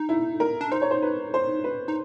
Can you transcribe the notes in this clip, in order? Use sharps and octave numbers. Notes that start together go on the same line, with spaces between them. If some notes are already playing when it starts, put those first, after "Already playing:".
Already playing: D#4
E4
A#4
D4
D#4 C5
C#5
C5
B4
C5
B4
D#4